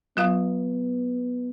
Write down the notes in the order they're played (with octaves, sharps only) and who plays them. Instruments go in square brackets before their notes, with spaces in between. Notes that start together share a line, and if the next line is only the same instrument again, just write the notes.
[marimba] F#3 F4 F5 [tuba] B3